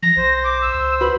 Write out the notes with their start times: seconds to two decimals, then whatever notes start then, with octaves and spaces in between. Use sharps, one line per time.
0.03 F3 A#6
0.17 B1 C5
0.44 D6
0.62 E6
0.74 C#2
1.01 F#4 B4 B5